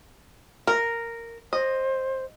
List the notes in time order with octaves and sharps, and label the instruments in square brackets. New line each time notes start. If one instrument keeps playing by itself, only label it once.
[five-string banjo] A#4
[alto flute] C5 [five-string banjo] D#5